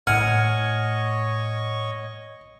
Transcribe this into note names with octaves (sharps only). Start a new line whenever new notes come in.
A2 C#5 D#5 F#5 G#5 C#6 F6